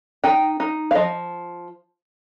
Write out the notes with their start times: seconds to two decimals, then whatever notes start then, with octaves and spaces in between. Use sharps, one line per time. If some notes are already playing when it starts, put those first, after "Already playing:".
0.24 D#4 G5
0.60 D#4
0.91 F5
0.95 F3 D#5